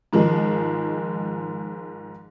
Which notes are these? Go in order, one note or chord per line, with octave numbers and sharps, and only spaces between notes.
G#2 D#3 F3 G#3